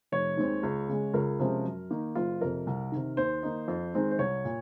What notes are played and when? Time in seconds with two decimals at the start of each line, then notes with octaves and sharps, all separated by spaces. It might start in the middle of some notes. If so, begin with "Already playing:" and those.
0.12 F1 C#5
0.37 D#2 D#3 G#3 C4
0.63 C#2
0.89 C#3 G#3
1.13 C#2 A#4
1.40 C3 F3 G#3 C#4
1.65 F#2
1.91 D#3 A#3 D#4
2.15 F#1 F4
2.41 F2 C3 A#4
2.67 C2
2.92 C3 D#3
3.17 D#2 C5
3.43 D#3 A#3 D#4
3.68 F2
3.94 D#3 G#3 C4 D#4
4.11 C5
4.19 C2 C#5
4.45 A#2